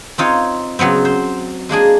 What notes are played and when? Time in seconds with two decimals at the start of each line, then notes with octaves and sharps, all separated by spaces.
0.18 C4 D#4 F4 C#5
0.79 C#3 F#3 B3 C4
1.05 C5
1.69 G#3 A#3 D4 G#4